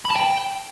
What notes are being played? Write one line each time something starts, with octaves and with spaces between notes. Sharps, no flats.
B5
A5
G5